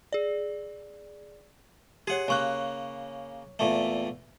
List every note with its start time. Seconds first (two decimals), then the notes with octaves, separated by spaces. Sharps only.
0.13 G#4 D5
2.07 G4 G#4 C#5 F#5
2.28 C#3 A#3 C#5 C#6 F#6
3.59 E2 A#2 A3